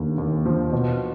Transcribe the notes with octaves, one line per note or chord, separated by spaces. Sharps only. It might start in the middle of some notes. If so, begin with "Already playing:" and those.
Already playing: D#2 D3
D#2
F3
B2